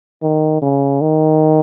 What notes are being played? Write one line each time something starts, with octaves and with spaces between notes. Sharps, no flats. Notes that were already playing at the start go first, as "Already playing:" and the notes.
D#3
C#3
D#3